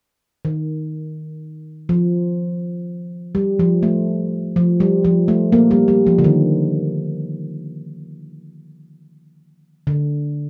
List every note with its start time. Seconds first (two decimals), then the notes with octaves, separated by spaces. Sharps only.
0.45 D#3
1.89 F3
3.35 G3
3.60 F3
3.83 A3
4.56 F3
4.80 G3
5.04 F3
5.28 A3
5.52 A#3
5.71 G3
5.88 G3
6.07 F3
6.18 D3
6.24 D#3
9.87 D3